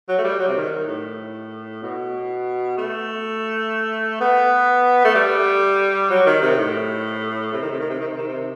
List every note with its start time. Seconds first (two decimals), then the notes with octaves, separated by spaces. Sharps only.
0.08 F#3
0.18 A3
0.24 G3
0.39 F#3
0.48 C3
0.56 D#3
0.87 A2
1.83 B2
2.78 A3
4.21 B3
5.05 A3
5.15 G3
6.10 F#3
6.26 D#3
6.42 C3
6.58 A2
7.53 C3
7.62 D#3
7.71 C3
7.80 D#3
7.90 C3
8.00 D#3
8.08 C3
8.18 D#3
8.27 C3